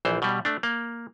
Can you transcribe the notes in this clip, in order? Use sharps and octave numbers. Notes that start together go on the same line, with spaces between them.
A#1 E3 C5
B2 G3
A3 D4
A#3